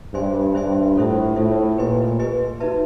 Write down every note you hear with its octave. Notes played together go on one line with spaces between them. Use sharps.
G2 C5 E5 G#5 C6
G2 C5 E5 G#5 C6
A2 F4 A4 C5 E5
A2 F4 A4 C5 E5
A#2 G4 B4 D#5 G#5 C6
G4 B4 D#5 G#5 C6
D#4 F#4 B4 E5 A5